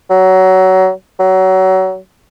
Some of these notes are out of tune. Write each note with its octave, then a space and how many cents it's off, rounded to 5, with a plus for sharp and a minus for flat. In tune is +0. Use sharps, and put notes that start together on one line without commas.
F#3 +20
F#3 +25